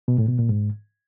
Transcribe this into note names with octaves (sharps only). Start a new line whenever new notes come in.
B2
A2
B2
A#2
G#2